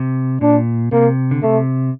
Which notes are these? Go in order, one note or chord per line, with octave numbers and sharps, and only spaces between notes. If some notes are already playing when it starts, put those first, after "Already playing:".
Already playing: C3
A#2 D4
C3 A#3
D3
C3 A3